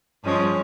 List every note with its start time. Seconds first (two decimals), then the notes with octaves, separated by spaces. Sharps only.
0.23 G2 F3 G#3 C#4